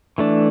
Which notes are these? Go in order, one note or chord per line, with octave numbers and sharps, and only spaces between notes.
E3 A3 D4